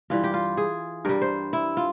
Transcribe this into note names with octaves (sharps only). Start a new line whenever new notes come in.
G2 E3 G3 F4
G4
F4
G#4
G2 G3 A#4
C5
E4
F4